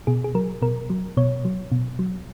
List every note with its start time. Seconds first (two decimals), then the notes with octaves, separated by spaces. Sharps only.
0.07 B2 G#4
0.24 G#4
0.35 F#3 A#4
0.62 B2 A#4
0.90 F#3
1.17 B2 C#5
1.45 F#3
1.72 B2
1.99 F#3